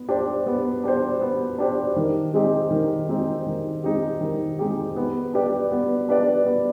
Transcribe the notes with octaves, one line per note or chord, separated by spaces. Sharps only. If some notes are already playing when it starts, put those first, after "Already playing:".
Already playing: B3
D4 G4 C5
B3
D4 G4 C5
B3
D4 G4 C5
D#3
G#3 C4 D#4 G4
D#3
G#3 C4 D#4 G4
D#3
G#3 C4 D#4 G4
D#3
G#3 C4 D#4 G4
B3
D4 G4 B4 D5
B3
D4 G4 B4 D5
B3